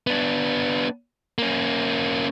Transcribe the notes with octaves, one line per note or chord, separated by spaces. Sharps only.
B3 D4
A#3 C#4